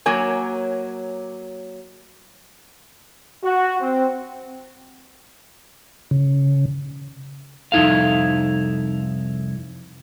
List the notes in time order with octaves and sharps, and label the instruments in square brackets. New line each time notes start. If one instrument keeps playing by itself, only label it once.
[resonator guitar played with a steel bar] F#3 A#3 C#5 G#5
[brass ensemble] F#4
C4
[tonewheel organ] C#3
[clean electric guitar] C2 F2 D#4 E4 A4 F5